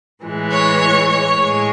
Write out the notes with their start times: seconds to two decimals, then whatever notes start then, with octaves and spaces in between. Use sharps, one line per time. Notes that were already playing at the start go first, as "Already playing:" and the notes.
0.23 A2 E3 G#3
0.52 C#5
1.09 C#5
1.37 A2 G#3